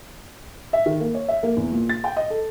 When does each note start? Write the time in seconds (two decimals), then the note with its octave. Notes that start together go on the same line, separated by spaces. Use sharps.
0.73 E5
0.86 D#3
1.00 A#3
1.14 C#5
1.28 E5
1.43 A#3
1.56 E2
1.72 A#2
1.89 A6
2.04 G5
2.16 D#5
2.30 A4